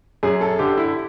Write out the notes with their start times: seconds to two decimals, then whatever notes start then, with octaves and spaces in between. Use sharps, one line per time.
0.23 F#2 G#4
0.41 A4
0.59 D3 G4
0.78 E4